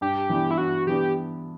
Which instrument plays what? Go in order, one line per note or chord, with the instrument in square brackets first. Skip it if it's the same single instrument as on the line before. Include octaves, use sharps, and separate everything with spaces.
[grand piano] G2 [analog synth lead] G4
[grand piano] E3 B3 D4
[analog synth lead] E4
[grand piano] G2 [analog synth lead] F#4
[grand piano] E3 B3 D4 [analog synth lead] G4